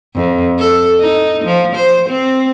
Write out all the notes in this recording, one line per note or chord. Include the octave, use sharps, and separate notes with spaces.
F2
A4
D#4
F3
C5
C4